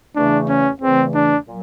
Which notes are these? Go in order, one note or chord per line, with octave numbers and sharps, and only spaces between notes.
E2 C#3 E3 A3 D4
C#4
E2 C#3 E3 A3 C4
D4
A#2 F#3